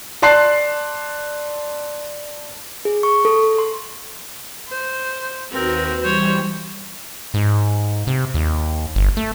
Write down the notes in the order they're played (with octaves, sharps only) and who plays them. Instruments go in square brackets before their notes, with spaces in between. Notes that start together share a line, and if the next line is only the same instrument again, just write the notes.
[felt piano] D5 A5 C6 F#6 C7
[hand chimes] G#4
C#6
A4
C6
[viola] C5
[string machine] D#2 F#4 B4 [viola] C4 A#4
[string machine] E3 G3 [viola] C5 C#5
[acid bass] G#2
C3
D#2
G1
A3